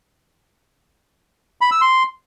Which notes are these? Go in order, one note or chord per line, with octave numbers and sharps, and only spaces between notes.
B5
E6
C6